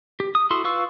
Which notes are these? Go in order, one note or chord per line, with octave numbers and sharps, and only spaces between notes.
G4
D#6
E4 F#4 A4 C6
F4 B4 F5 C#6 E6